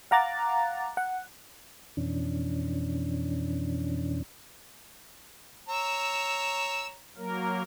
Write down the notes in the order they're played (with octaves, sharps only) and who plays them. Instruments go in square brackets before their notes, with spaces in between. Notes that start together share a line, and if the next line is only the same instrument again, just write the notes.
[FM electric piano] F5 F#5 A#5 D6 F#6 A6
F#5
[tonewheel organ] F2 B2 E3 C#4 D4
[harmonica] C#5 A#5 [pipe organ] E6
[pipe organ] F#3 A#3 A#4